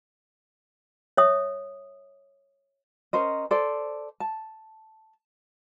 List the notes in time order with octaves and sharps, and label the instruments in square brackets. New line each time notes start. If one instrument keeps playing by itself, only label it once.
[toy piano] C#5 E5 D#6
[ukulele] C#4 A#4 C5 D#5
A4 C5 D5
A5